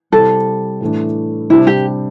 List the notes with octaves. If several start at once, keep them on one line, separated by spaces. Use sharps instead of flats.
C3 G3 E4 A4
A2 E3 A3 D4
C3 G3 D4 E4
G4